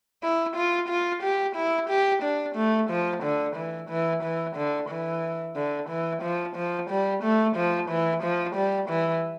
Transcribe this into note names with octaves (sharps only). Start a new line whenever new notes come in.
E4
F4
F4
G4
E4
G4
D4
A3
F3
D3
E3
E3
E3
D3
E3
D3
E3
F3
F3
G3
A3
F3
E3
F3
G3
E3